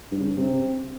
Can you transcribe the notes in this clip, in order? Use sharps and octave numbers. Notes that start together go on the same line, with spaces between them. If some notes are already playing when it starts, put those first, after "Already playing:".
G2
C#3
G2
C3